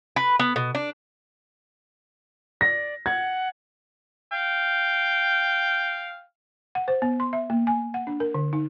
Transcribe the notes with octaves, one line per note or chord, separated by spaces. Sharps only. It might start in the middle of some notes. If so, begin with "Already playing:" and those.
B4
B3
B2
D4
D5 A#6
F#5 G#6
F5 G5
F#5
C5
B3
C6
E5
A#3
G#5
F#5
D4
A#4
D3
D#4